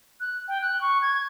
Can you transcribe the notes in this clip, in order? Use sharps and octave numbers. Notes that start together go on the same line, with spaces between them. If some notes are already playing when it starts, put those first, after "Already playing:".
F#6
G5
F#6
C#6
G#6